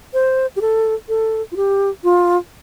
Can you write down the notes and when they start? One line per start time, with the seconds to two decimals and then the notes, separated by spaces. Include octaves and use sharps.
0.13 C5
0.56 G4
0.61 A4
1.09 A4
1.52 F4
1.56 G4
2.04 F4